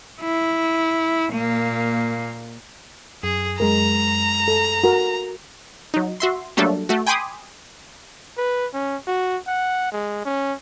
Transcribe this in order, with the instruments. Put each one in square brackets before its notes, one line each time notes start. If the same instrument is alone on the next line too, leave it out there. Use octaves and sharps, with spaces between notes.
[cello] E4
A#2 A#3
[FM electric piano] F#2 [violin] G#4
[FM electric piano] F#2 G#3 [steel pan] A#4 [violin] A#5
[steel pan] A4
F#4 A#4
[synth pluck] F#3 D#4
F#4 E5 C6
F#3 G3 A3 A#3 D4 A4
A3 F#4
G5 G#5 B5 C6 D6 D#6
[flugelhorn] B4
C#4
F#4
F#5
G#3
C#4